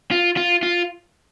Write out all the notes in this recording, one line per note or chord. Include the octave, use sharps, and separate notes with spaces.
F4
F4
F4